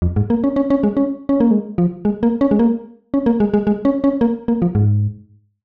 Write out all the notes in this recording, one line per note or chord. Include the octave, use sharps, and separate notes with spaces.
F2
G#2
A#3
C#4
C#4
C#4
G#3
C#4
C#4
A#3
G#3
F3
G#3
A#3
C#4
G#3
A#3
C#4
A#3
G#3
G#3
G#3
C#4
C#4
A#3
A#3
F3
G#2